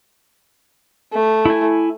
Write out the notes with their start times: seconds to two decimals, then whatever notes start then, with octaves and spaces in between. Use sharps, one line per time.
1.13 A3
1.45 E4 G#5